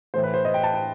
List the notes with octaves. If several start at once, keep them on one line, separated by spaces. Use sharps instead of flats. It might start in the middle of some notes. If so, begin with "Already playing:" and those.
A2 E3 A3 C5
B4
C5
D#5
G5
A5
G5